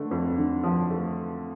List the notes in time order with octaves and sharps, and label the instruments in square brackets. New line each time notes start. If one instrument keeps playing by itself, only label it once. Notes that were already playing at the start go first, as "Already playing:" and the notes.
Already playing: [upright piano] D3 A3
F2
D3
F3
A3